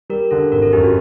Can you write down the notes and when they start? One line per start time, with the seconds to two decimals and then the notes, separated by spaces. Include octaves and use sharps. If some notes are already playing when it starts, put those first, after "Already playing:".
0.10 G3 A#4
0.31 D3 A4
0.52 G#1 A#4
0.62 A4
0.73 F#2 G4
0.84 F#4